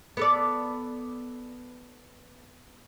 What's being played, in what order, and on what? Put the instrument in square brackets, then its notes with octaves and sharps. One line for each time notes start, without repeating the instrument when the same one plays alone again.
[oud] B3 A4 D5